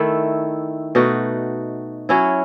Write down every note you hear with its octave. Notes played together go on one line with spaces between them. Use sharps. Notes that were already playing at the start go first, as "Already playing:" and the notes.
Already playing: D#3 A3 E4
B2 A3 D#4 F#4
F#3 C#4 E4